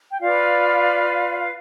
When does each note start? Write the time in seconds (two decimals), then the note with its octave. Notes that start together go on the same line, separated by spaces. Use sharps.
0.10 G5
0.21 F4 B4 D5 F5
1.38 F5